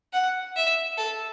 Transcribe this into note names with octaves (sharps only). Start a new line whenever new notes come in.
F#5
E5
A4